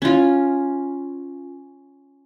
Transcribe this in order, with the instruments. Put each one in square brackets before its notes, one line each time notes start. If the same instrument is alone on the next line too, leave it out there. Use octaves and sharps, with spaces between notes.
[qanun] C#4 F4